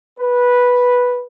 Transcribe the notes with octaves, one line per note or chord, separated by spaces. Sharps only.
B4